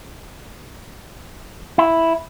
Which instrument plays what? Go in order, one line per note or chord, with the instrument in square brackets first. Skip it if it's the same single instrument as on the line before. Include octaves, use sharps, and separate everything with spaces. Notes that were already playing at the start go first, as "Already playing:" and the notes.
[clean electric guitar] E4